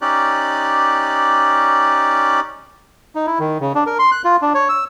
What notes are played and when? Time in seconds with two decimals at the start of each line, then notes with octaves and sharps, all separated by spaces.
0.02 C#4 D#4 G4 D5 F#6
3.15 D#4
3.27 E4
3.39 D#3
3.61 C#3
3.75 D4
3.87 A#4
3.99 C6
4.12 F#6
4.24 F4
4.42 D4
4.55 C#5
4.69 E6